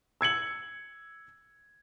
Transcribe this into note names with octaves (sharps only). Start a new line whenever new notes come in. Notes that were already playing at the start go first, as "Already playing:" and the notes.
E6 G#6 C#7 F#7